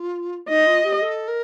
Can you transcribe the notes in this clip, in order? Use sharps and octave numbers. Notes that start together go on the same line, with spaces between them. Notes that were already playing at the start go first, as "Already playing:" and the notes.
Already playing: F4
D#4 D#5
F4
G4
A4
A#4